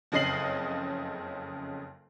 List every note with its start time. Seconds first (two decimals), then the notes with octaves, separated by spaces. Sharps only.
0.12 F#1 F2 C#3 D#5 C7 F#7